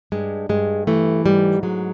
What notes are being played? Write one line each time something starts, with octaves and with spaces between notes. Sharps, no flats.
G2 G#3
G2 G#3
E3 A3
G#2 G3
F#3 G#3